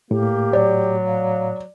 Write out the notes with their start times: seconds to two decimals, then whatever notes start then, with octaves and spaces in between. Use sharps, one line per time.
0.11 A2 A#3 G4
0.53 F#3 D5
1.06 F5